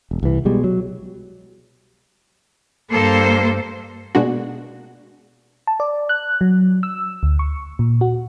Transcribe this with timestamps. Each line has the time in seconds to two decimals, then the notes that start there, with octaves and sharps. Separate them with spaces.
0.11 E1
0.23 C2 E3
0.45 B2 G3 G#3
0.64 F#3
2.90 G2 A#3 A4 C5
4.15 B2 G#3 A#3 D4 F#4
5.67 A5
5.80 D5
6.09 F#6
6.41 F#3
6.83 E6
7.23 D2
7.39 C#6
7.79 A#2
8.01 F#4